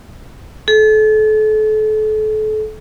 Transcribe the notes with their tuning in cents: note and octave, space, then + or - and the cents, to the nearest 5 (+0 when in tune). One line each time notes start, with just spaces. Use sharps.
A4 -35